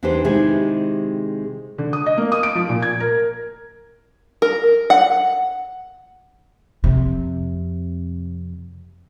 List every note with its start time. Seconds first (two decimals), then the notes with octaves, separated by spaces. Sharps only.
0.03 E2 D4 D#4 G4 B4 C5
0.24 C3 D#3 G#3 E4 G4 G#4
1.78 D3
1.93 D#6
2.06 D#5
2.18 A#3
2.32 D#6
2.43 D7
2.55 F3
2.69 A#2
2.82 G#6
3.00 A#4
4.42 A#4
4.90 F#5
6.84 F2 C3